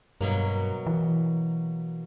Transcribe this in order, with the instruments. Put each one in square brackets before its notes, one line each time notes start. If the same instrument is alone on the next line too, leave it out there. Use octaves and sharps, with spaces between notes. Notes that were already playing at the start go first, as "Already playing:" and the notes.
[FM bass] G2 [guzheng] B2 F#3 A#3
[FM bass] E3